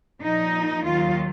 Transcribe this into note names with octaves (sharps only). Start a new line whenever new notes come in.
A#2 F3 D#4
D#2 D#3 F#3 F4